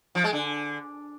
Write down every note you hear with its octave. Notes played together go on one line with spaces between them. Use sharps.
F3
G#3
D3